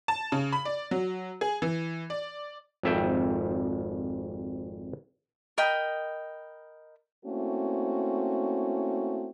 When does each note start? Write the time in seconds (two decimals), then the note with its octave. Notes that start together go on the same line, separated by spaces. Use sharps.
0.08 A5
0.32 C#3
0.52 B5
0.65 D5
0.91 F#3
1.41 G#4
1.62 E3
2.10 D5
2.83 G#1 F2 E5 G5
5.58 A#4 D#5 G5 B5
7.25 A3 A#3 C4 C#4 E4 F#4